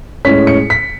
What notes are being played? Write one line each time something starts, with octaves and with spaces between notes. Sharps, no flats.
A2 G#3 C#4 B6
C#7
B6